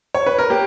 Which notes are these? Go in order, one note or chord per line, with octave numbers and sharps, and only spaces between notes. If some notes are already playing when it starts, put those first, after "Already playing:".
C#5
B4
A#4
A#3 G4